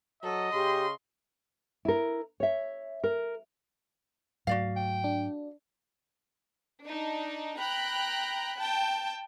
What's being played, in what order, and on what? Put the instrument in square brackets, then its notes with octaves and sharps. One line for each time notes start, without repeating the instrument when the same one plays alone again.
[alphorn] F#3 [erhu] A4 [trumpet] D#5
[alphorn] C#3 [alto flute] G4 [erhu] C6
[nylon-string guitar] E4 A#4
C#5 E5
A#4
[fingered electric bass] G#2 F#3 A3 [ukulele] F#4 D5 F5
[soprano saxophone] G5
[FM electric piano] D4
[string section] D4 D#4
G5 A#5 B5 F#6
G5 A5